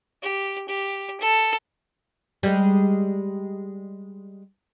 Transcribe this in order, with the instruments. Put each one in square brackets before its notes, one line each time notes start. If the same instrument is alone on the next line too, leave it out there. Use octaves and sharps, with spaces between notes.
[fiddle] G4
G4
A4
[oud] G3 G#3